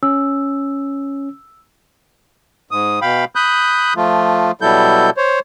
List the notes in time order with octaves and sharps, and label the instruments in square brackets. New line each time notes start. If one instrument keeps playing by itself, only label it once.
[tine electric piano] C#4 [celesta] E6
[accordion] G#2 D#6
B2 F5 G5 B5
B5 D#6 F#6 G6
F3 A3 F4
B2 F#3 G3 E4 A4 G6
C5 C#5